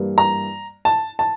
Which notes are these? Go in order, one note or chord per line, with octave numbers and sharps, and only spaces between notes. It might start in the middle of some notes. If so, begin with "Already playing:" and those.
Already playing: G2 E3 G3 A#3
A#5
A5
A5